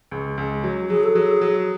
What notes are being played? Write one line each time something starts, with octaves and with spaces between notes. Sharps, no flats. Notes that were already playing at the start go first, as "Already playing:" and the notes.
C#2
C#2
F#3
F#3 G#4
A4
F#3 G#4
F#3